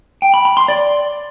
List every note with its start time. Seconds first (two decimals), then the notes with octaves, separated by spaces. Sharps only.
0.22 G5
0.34 B5
0.45 B5
0.57 C6
0.68 D5